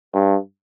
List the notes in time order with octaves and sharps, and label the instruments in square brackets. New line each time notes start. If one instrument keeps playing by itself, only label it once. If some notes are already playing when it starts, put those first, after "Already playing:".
[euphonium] G2